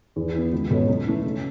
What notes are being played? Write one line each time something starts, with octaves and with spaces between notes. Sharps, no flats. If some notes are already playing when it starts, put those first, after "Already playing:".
E2
E3 B3
C#2
B2 B3 A4 C#5
F#2
E3 A3
C#3